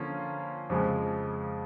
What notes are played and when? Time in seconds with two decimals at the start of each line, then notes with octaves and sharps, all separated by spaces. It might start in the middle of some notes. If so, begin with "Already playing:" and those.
Already playing: D3 F3 A#3 C#4 F4
0.70 F2 C#3 F3 G#3